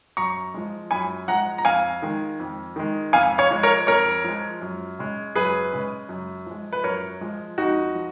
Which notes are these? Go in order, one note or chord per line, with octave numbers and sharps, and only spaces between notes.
F#2 A#5 C#6
F3 G#3
F#2 G#5 B5
F3 G#3 F#5 A#5
A#5
F2 F5 G#5
D#3 G#3
F2
D#3 G#3
F2 F5 G#5
C#5 F5
F3 G#3
A#4 C#5
F2 A#4 C#5
F3 G#3
F#2
C#3 G#3
F#2 G#4 B4
C#3 G#3
F#2
F3 G#3
B4
F#2 A#4 C#5
F3 G#3
F2 D#4 F#4
F3